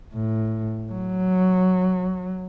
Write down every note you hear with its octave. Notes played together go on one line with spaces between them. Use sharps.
A2
F#3